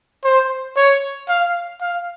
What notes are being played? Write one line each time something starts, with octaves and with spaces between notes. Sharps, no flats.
C5
C#5
F5
F5